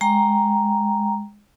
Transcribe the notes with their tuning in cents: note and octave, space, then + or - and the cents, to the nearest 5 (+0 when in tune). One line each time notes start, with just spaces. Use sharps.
G#3 +0 G5 +0 A#5 +0